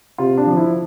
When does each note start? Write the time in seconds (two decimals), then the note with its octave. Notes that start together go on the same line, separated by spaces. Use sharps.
0.18 C3 F4
0.37 D4
0.47 F3
0.57 E4